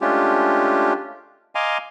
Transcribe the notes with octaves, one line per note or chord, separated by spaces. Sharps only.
G#3 A3 C#4 D4 F4 G4
D#5 F5 G#5 A#5 C6 D6